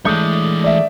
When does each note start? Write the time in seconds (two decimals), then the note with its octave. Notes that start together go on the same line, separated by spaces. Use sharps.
0.05 E3 G#3 A3 D4 C#5 G6
0.64 D5 E5